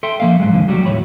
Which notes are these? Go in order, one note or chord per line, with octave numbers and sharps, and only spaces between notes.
A4 E5 G5 C6
F3 A#3 F5
G#2 F#3 G#3
D#2 D3 F3
F#3 G3 A3 F#4 G4
D#2 A2 C#5 B5